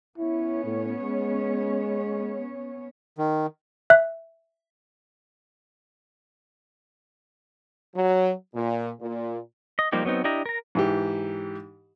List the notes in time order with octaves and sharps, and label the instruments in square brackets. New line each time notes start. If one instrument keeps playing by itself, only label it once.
[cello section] B3 C#4 C#5 [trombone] E4
[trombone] A2
G#3
[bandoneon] D#3
[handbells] E5 F#6
[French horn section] F#3
A#2
A#2
[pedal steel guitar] D#5
F3 G3 A#3 D#4 G4
F#3 B3 C4 D#4
D4 E4 G4 D#5 A#5
A#4 A#5
[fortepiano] G#2 E3 G4